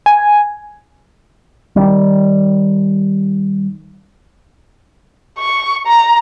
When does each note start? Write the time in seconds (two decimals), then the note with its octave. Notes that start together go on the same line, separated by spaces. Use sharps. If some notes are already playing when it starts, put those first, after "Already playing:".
0.06 G#5
1.76 D#3 G3
5.39 C#6
5.87 A#5